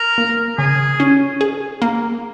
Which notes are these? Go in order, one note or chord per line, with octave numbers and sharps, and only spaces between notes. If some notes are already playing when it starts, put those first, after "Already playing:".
Already playing: A#4
A#3
C#3 G#4
C#4
G#4
A#3